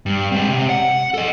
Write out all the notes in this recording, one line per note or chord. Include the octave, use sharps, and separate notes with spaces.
G2
G#3 C4
C3
F#5
A4 D#5